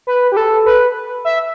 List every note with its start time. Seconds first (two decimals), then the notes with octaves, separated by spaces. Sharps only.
0.07 B4
0.32 G4
0.37 A4
0.66 B4
1.25 E5